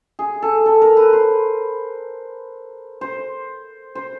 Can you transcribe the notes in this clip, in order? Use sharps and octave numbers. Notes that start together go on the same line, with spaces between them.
G#4
A4
A4
A#4
B4
C5
C5
C5